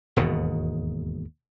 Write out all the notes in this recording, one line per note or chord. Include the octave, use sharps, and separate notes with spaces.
E1 D#2 G#2 B2